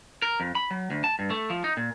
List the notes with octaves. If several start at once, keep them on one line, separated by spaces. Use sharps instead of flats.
A#4
F2
B5
F#3
D2
A5
G2
A3
F3
D#4
A#2